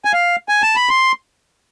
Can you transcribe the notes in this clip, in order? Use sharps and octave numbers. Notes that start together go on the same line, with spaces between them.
G#5
F5
G#5
A5
B5
C6